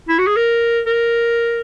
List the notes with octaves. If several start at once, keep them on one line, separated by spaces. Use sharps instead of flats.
E4
F#4
G#4
A#4
A#4